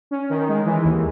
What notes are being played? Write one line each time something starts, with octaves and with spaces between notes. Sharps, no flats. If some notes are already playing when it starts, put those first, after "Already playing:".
C#4
D#3
G#3
E3
D#2